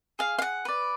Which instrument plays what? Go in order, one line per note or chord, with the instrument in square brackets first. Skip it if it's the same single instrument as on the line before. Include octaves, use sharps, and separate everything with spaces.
[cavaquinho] G#4 F5
F5
F#5
B4 D5